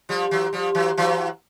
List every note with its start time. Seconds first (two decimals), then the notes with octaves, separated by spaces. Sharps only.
0.09 F3 G3
0.31 E3 F#3
0.53 F3 G3
0.75 E3 F#3
0.97 E3 F#3